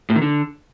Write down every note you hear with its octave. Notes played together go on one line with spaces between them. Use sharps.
A2
D#3
D3